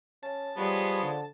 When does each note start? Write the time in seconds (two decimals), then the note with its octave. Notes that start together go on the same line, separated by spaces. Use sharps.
0.23 C#4 A5
0.57 F3 G3 G#3 B3 C#5
1.02 D3